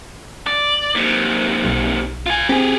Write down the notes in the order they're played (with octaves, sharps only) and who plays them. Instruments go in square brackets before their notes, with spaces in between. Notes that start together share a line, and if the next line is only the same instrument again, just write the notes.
[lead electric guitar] D5
D#2 C3
[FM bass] B1
[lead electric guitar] F4 G#5
[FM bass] C4 [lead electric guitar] G4 G#4